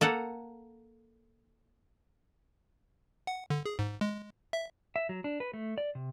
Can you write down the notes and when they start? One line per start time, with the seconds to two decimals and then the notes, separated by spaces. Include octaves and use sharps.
0.01 A#3 A4 F#5
3.27 F#5
3.50 D3
3.66 G#4
3.79 G#2
4.01 G#3
4.53 E5
4.96 E5
5.09 F#3
5.24 D4
5.40 B4
5.53 A3
5.78 D5
5.95 C3